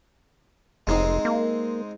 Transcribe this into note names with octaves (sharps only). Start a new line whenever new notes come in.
F1 G#3 C4 D#4
A#3